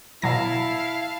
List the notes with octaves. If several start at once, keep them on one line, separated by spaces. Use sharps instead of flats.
B2 F#3 E4 F5 A5 A#6